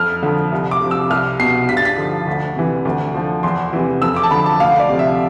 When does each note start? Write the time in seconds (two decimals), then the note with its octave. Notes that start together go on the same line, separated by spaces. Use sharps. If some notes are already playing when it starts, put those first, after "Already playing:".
Already playing: F2 F6
0.23 D3 F3
0.52 C2
0.71 D6
0.81 C3 F3
0.91 E6
1.10 C2 F6
1.40 B2 C7
1.69 G2 B6
1.77 A6
1.85 B6
1.98 D3 F3
2.27 D2
2.56 C3 E3
2.85 D2
3.14 D3 F3
3.43 E2 C6
3.73 C3 E3
4.02 F2 E6
4.16 D6
4.23 A5
4.31 D3 F3 B5
4.46 A5
4.60 D2 F5
4.79 D5
4.89 C3 F3
4.99 E5